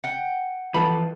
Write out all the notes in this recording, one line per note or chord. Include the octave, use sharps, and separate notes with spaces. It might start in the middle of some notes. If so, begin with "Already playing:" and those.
F#5 G5 C#7
E3 F3 A4 B4 A5 B5